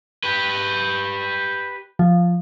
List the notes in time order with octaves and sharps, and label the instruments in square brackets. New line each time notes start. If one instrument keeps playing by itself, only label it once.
[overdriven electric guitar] G4 B4
[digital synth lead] F3